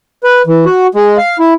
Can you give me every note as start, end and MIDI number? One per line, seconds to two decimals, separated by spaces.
0.24 0.42 71
0.47 0.65 52
0.65 0.87 66
0.95 1.17 56
1.18 1.37 77
1.39 1.54 64